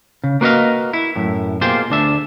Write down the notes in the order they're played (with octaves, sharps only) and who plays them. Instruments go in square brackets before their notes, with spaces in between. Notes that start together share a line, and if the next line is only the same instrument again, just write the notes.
[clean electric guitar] C#3
A#3 F#4 B4 C#5 D#5 F5
E4
F#2 A2
B2 A#3 F4 G4 G#4 C5
D2 D4 E5